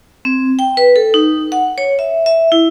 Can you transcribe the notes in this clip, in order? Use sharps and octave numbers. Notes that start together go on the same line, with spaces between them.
C4
G5
B4
A4
D#4
F#5
C#5
E5
E5
E4